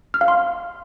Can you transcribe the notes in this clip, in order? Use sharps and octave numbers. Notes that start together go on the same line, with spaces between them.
F6
F5
C6